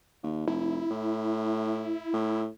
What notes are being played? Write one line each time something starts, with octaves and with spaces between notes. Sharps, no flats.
D#2
F1 E4
A2
A2